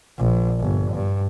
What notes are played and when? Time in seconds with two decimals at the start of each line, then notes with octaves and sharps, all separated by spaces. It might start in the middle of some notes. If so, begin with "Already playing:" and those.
0.18 A#1
0.60 G1
0.94 G2